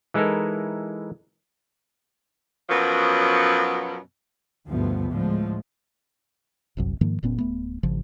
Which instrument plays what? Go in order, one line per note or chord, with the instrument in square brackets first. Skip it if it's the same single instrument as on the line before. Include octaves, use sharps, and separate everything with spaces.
[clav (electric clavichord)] E3 G#3 D#4 E4 A4 A#4
[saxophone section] F#2 B2 F3 F#3 B3
[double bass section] D2 G2 B2 F3 A3 B3
A2 D3 F3 G#3
[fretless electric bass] G1 C2 F#2
G#2 D#3 F3 A#3
F1 A#2 B3 C#4
D1 A3 B3
G#1 C#3 F3